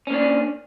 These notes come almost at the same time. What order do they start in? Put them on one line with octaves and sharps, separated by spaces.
C#4 A#3 D4